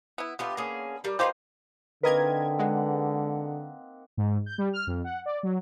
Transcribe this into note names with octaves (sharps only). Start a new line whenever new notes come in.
B3 E4
D3 B3 F4 G4 E5
A#3 C#4 G#4
G3 A#4
A#3 D#4 F4 G4 B4 C5
D3 A#3 C4 D#4 A#4 B4 D#5 G#6
G#3 F#5
G#2
G6
G3
F6
F2
F#5
D5
F#3